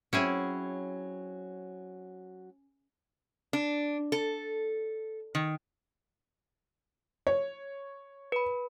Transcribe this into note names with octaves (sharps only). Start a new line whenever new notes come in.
F#3 C4 C#4 E4 G#4
D4
A4
D#3
C#5
B4 B5